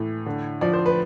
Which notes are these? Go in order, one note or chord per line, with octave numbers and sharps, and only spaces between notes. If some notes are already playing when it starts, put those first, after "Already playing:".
Already playing: A2 E3
D3
F3 D5
C5
B4